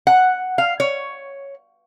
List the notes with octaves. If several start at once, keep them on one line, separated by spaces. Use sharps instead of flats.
F#5
F5
C#5